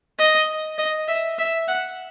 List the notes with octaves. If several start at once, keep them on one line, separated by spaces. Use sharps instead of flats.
D#5
D#5
E5
E5
F#5